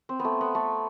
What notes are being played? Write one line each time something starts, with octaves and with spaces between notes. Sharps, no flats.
C4
B3
A3
B3
A3